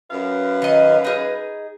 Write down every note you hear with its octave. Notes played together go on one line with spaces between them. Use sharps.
F#2 B4 F5
D#3 D#5
D#4 G#4